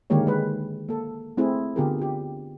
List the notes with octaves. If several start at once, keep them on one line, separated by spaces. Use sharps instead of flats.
D3 D#3 G#3 A#3 G4 C#5
G#3 B4
A#3 A4
A3 C4 E4 G#4
D3 B3 F4 G4 G#4 A#4
F4 G4